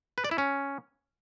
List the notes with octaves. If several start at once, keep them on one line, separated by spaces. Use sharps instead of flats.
B4
D5
E4
C#4